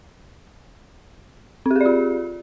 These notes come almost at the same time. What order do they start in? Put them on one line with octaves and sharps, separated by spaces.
C4 G4 G#4 D5 F4